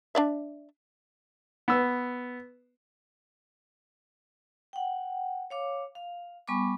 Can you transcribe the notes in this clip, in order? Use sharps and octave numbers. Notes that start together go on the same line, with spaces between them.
D4 D5 E5
B3 E6
F#5 G5
C#5 F5 D6
F5
G3 B3 G#5 B5 C#6 D6